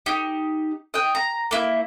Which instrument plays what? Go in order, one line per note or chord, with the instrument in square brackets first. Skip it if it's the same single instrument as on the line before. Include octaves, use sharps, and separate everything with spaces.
[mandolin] D#4 G4
D#5 G5
A#5
A#3 E4